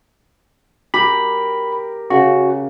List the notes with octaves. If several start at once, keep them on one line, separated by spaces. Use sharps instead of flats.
G4 A#4 B5
C#3 F#4